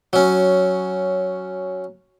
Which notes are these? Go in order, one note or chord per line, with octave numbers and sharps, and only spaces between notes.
F#3 C#4